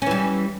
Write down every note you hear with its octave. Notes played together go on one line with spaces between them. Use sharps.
E3 G3 C#4